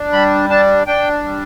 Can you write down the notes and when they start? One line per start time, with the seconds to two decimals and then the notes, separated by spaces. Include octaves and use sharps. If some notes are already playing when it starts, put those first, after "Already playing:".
Already playing: D4
0.13 G3 B5
0.50 D4 A5
0.87 D4 G5
1.24 G3